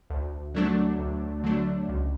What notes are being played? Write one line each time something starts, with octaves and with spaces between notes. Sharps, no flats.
D2
D3 F#3 A3 D4
D2
D3 F#3 A3 D4
C#2